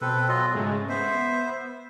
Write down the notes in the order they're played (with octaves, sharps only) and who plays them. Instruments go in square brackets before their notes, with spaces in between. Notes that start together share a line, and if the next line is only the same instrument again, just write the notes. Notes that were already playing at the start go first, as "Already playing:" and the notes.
[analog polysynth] B2 [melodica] C4 A4 B4
[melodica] F#3 F4 D#5
[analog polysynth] G#2 C#3 G#3 [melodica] A3
[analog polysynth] B3 [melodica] C5 E5